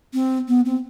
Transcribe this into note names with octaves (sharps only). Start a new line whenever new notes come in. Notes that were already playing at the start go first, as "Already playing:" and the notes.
C4
B3
C4